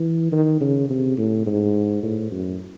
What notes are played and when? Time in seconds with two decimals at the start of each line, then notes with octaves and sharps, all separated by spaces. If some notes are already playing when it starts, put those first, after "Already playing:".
Already playing: E3
0.32 D#3
0.61 C#3
0.90 C3
1.18 A2
1.46 G#2
2.03 A2
2.31 F#2